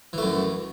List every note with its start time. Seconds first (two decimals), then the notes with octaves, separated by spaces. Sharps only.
0.13 E3
0.18 A3
0.23 F#2